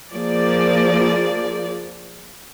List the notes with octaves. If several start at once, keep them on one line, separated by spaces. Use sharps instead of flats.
F3 A#3 G#4 D5